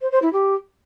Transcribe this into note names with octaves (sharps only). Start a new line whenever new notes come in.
C5
C5
E4
G4